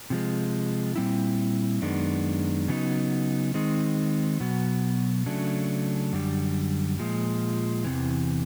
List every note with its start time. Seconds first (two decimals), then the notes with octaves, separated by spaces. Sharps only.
0.10 C3 F3 G#3
0.96 A#2 G3 C4 E4
1.82 F#2 D#3 G#3 B3 D4
2.68 C#3 F#3 B3 D#4
3.54 D#3 G#3 C4 D#4
4.40 B2 F#3 B3
5.26 C#3 F#3 A3 D4
6.13 F#2 D3 G3
6.99 A#2 F3 G#3
7.85 E2 C3 E3